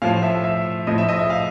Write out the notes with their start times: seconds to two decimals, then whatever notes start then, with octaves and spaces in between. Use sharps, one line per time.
0.02 A2 F3 F5
0.23 E5
0.44 E5
0.87 A2 F3 D#5
0.98 E5
1.09 D#5
1.19 E5
1.30 F5